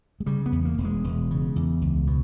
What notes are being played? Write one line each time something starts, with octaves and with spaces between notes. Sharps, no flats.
G#3
C#3 G3
B3
E2
A#3
E1
G#3
E1
C#3
E2
C#2
B2